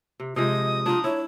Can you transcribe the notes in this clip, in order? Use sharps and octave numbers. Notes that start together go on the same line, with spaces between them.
C3
C3 F3 G#3 D#5 D#6
D4 D#4 F4
E4 C#5